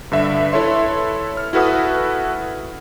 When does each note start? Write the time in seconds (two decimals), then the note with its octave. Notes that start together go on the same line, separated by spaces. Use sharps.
0.12 G2 D3 E5
0.52 E4 A4 B4 C#5 E5 C6
1.37 F6
1.53 E4 F#4 A4 B4 F#5 D#6